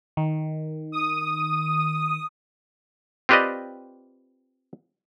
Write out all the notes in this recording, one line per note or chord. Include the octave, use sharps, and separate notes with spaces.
D#3
D#6
C4 F4 G4 B4 D5 D#5